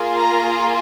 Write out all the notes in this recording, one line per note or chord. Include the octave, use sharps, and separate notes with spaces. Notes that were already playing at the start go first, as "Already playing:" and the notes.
Already playing: A#3 F4 G#4
A#5